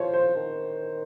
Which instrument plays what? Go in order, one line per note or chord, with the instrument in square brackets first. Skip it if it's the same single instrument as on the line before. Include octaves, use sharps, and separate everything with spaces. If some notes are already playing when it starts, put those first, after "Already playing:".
Already playing: [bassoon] F3 [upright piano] C5 C#5
[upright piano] C5
[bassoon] D#3